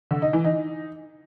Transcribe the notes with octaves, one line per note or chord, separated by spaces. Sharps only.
D3
D#4
E3
D#4